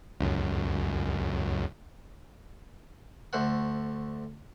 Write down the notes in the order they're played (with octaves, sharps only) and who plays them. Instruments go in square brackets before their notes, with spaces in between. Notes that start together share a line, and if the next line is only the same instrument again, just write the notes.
[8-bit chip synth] C#2 F#2
[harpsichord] D2 A3 C5 F#5